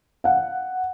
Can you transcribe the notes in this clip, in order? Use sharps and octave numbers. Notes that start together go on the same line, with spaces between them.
F5 F#5